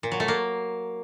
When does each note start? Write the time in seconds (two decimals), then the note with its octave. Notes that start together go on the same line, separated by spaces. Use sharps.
0.03 A#2
0.12 F#3
0.20 A3
0.28 A#3